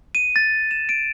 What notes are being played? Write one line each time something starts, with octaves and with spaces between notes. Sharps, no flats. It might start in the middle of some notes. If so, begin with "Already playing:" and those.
D#7
A6
E7
D7